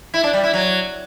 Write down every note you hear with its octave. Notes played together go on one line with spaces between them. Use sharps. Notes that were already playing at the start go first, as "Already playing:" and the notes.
E4
D4
G3
E4
F#3